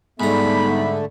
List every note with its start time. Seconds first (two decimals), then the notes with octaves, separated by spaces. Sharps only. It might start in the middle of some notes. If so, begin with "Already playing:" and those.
0.20 G#2 D3 G3 A3 B3 D#4 A#5 B5